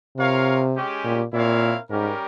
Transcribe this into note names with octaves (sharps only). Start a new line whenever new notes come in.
C3 F4 A#4 C#5 F5
G#3 C#4 G4
A#2
A#2 C4 E4 A#4 C#5 F5
G#2 G3 C#4 G4 A#4